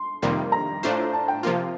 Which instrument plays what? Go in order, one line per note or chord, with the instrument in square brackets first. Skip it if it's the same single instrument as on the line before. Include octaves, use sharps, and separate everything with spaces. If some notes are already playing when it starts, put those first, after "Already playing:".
Already playing: [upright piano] C6
[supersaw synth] F2 C3 D#3 G3 A#3
[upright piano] A#5
[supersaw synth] A2 A3 D4 F4 C5
[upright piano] A5
G5
[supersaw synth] C3 F3 A#3 F4 [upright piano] F5